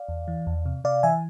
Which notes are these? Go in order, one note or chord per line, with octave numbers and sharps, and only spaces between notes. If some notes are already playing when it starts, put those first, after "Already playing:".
Already playing: D5 F5
E2
E3
E2
C3
C3 D5 F5
E3 E5 G#5